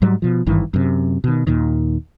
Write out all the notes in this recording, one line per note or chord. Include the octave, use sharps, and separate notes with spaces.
G#2 F#3 G3
B2 F3
G#1 G2 D#3 E3
F#2 C3
B2 D#3
D#2 A#2 D#3